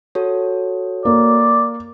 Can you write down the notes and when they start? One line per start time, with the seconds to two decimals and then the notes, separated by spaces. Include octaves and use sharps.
0.15 F#4 A4 C#5
1.05 A#3 D5